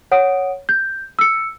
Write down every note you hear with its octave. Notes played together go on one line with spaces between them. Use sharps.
C#5 F#5 D#6 D7
G6
E6 C#7